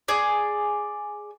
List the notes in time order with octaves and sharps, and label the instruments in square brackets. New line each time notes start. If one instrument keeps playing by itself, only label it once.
[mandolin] G#4 D5